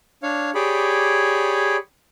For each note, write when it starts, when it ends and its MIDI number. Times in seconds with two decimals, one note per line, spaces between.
0.23 0.51 62
0.23 0.51 73
0.23 0.51 77
0.55 1.77 67
0.55 1.77 68
0.55 1.77 73
0.55 1.77 74
0.55 1.77 83